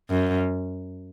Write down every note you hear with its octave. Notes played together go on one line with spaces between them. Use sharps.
F#2